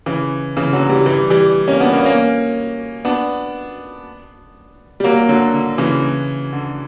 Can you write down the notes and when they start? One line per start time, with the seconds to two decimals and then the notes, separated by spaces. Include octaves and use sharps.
0.06 C#3 E3
0.57 C#3 E3
0.73 D3 F#3
0.89 E3 G3
1.06 E3 G3
1.30 E3 G3
1.68 A#3 C#4
1.80 B3 D4
1.93 A#3 C#4
2.05 A#3 C#4
3.05 B3 D4
5.00 G3
5.04 F#3 A#3
5.29 D3 F#3
5.54 D3
5.78 C#3 E3
6.53 D3